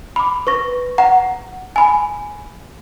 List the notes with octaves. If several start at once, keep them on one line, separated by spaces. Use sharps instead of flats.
B5 D6
B4 C#6 A#6
F#5 A#5
G#5 B5